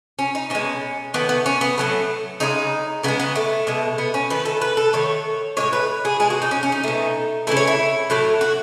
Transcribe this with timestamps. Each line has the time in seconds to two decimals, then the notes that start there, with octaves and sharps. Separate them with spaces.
0.19 C#4
0.35 D#4
0.50 B2 G#3 C#4
1.14 D#3 A3 B3
1.29 B3
1.46 C#4
1.61 B3
1.78 A2 F#3 A3
2.40 C#3 E3 G#3 D#4
3.03 C#3 E3 B3
3.08 G#3
3.20 B3
3.36 A3
3.67 B2 G#3
3.98 B3
4.14 C#4
4.30 D#3 A3 B4
4.45 A4
4.61 B4
4.77 A4
4.93 D#3 A3 C#5
5.57 A2 E3 G#3 C#5
5.73 B4
6.05 G#4
6.20 B2 G#3 G#4
6.30 F#4
6.42 D#4
6.51 C#4
6.63 C#4
6.72 D#4
6.84 B2 A3
7.47 C#3 E3 A3 E4
7.57 C#5
7.67 E4
8.10 A2 F#3 A3
8.41 F#4